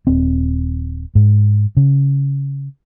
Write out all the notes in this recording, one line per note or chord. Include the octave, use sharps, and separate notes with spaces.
D#1 C4
G#2
C#3